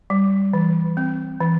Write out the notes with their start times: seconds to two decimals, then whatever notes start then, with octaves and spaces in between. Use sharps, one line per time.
0.10 G3
0.53 E3
0.97 C4
1.41 E3